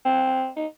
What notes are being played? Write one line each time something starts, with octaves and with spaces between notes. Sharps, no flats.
C4
D#4